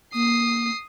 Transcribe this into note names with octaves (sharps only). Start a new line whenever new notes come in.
A#3 D#6 C7